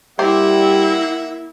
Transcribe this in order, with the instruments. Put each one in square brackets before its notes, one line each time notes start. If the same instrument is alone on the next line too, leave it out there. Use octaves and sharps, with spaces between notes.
[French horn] G3 [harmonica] A#3 E5 F#5 [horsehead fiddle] E4 [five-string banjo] G4 C5